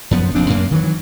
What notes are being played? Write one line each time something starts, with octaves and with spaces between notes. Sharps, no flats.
F#2 F3 B3
F1 A#1 C4 D4
F#2 A#3
D#3 E3 F#3